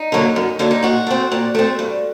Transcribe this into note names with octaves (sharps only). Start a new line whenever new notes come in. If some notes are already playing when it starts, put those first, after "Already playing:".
Already playing: D#4
D3 F#3 A#3
F#2
D3 F#3 A#3
D#4
A#2 F#4
A3 C4
A#2
A3 C4
G2